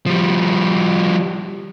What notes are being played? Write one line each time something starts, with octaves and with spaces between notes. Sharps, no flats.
F3 G3